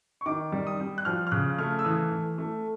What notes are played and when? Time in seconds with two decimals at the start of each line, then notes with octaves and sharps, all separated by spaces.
0.21 C#6
0.26 D#3 D6
0.52 G3
0.67 D#6
0.80 G3
0.98 F#6
1.05 F3 F6
1.27 F6
1.32 C#3 F#6
1.58 A3 F6
1.79 E6
1.84 E3 D#6
2.12 E3
2.38 A3